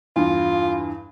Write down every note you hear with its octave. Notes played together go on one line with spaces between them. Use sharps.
E2 G2 F4